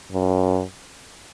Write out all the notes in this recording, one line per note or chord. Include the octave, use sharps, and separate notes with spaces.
F#2